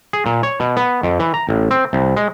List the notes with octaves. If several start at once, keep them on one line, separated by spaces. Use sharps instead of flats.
G#4
A#2
C#5
B2
B3
F2
E3
A#5
A1
C4
C2
G#3